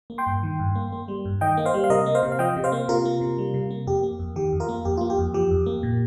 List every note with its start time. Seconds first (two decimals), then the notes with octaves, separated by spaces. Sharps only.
0.10 A#3
0.18 G5 C6
0.27 G2
0.43 D#3
0.60 G2
0.75 A#3
0.92 A#3
1.08 G3
1.25 G2
1.41 D#3 D#5 G5
1.57 A#3
1.65 C5 F5
1.74 G3
1.84 F5
1.90 C3 A#4 D#5
2.06 A#3
2.15 C5 F5
2.23 C3
2.32 F5
2.39 F3 D#5 G5
2.56 C3
2.64 C5 F5
2.72 A#3
2.88 C3 F4 A#4
3.05 A#3
3.21 C3
3.38 G3
3.54 C3
3.70 A#3
3.87 F2 G4
4.03 A#3
4.19 F2
4.36 D#3 G4
4.53 F2
4.60 F4 A#4
4.69 A#3
4.85 F2 G4
4.97 F4
5.01 A#3
5.10 G4
5.18 F2
5.34 F3 G4
5.51 F2
5.66 A#3
5.83 A#2